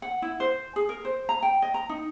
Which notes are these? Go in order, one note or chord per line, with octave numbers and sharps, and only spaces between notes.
F#5
E4
C5
G#4
A#4
C5
A#5
G5
D#5
A#5
D#4